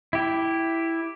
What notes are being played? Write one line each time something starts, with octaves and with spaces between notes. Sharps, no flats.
E4 G4